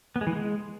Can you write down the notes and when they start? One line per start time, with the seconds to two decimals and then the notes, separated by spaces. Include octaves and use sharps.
0.16 B3
0.21 G#3
0.27 E3
0.32 G#3